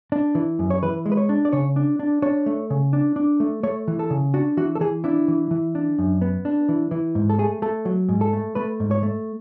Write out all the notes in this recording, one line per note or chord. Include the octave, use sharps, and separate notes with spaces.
D4
E3
F#2
C#5
E3 B4
G#3
B4
C#5
D4
D5
C#3 C#5
D4
D4
D4 C#5
A3
C#3
D4
D4
A3
A3 C#5
E3
A4
C#3
D4 F#4
E3 F#4
A4
E3 G#4
D4 E4
E3
E3
D4
F#2
B3
D4
E3
E3
G#2
A4
A3 G#4
A3 A4
F#3
G#2
A4
A3
A3 B4
G#2
C#5
A3